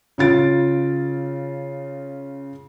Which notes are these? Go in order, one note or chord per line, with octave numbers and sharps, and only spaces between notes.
C#3 F4 A6 D7